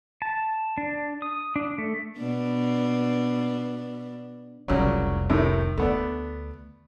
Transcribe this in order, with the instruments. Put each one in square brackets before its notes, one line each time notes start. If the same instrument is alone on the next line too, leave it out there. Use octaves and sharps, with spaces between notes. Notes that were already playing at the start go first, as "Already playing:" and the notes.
[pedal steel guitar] A5
D4
D#6
D4
A3
[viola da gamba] B2 D4
[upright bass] F1 C2 [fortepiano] A#2 C#3 F#3
[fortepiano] A2 C3 D#3
[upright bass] D2 [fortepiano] A3 B3 D4